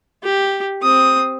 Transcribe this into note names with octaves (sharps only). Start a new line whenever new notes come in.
G4
C4 D#6